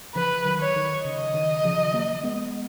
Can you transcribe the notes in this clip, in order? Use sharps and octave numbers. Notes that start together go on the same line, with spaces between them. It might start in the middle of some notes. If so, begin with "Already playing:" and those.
C#3 F3 B4
D#3 F#3
C#5
D#3
C#3 D#5
D#3
C#3 F3
F#3 A#3
G#3 B3